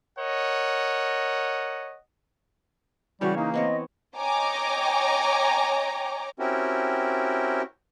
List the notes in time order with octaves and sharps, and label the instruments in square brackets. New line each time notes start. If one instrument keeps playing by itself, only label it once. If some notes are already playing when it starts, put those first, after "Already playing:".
[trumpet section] A#4 C#5 D#5 F#5
[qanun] C#3 E3 C#5 [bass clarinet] G3 [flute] F#4
[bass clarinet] A#3 [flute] D#4
[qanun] B3 C4 C#5 [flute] D#5
[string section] C#5 D#5 G5 G#5 A#5 D6
[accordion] C4 C#4 E4 F#4 G4 A#4